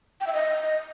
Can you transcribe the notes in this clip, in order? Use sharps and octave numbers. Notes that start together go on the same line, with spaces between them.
G5
E5
D#5